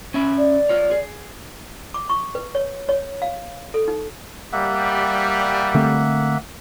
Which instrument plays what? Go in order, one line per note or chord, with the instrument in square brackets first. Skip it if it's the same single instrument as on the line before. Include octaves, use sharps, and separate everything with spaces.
[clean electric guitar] C#4 E5 B5
[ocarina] D5
[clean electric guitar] F4 C#5
G#4
[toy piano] D6
C#6
B4
C#5
C#5
F5
A4
D#4
[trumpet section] G3 [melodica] A#3 E5 F#5
[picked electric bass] D3 A3 C4